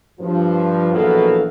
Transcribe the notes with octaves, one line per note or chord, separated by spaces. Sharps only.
G2 F3
A#1 B2 E3 F#3 A4 F5